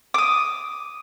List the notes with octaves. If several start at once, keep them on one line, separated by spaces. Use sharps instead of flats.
D6 D#6